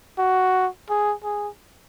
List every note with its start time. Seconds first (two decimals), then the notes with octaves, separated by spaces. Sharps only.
0.18 F#4
0.89 G#4
1.24 G#4